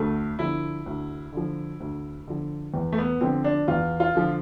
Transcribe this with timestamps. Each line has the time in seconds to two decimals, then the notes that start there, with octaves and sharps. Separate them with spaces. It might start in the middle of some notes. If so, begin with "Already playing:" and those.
Already playing: D2 A3
0.39 D3 F3 E4
0.86 D2
1.32 D3 F3
1.80 D2
2.28 D3 F3
2.74 E2
2.92 A3
2.98 B3
3.21 D3 F3 C4
3.44 D4
3.68 E2 F4
4.00 F4
4.15 D3 F3